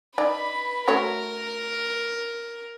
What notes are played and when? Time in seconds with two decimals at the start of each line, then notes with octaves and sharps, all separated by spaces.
0.18 D#4 B4 D5 B5
0.88 A3 F#4 A#4 C#5